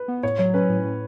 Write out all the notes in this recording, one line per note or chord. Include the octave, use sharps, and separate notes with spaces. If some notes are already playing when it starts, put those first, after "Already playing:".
Already playing: B4
B3
A2 C#5
F#3 C#5
C#4 B4
A2
A2